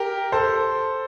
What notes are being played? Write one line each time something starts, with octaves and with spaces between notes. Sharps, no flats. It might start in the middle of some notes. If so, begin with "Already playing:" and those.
Already playing: G4 A#4
A4 C5